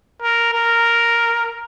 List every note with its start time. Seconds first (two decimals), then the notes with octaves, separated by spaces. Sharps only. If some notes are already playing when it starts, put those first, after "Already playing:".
0.22 A#4
0.53 A#4